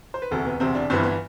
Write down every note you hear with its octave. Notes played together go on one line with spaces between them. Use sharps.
C5
B4
E1 D2 C3 A4
B3
E1 D2 C3 C4
D4
G1 G2 E3 C4
B3